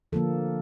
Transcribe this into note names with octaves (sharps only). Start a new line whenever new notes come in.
D3 F3 A#3 A4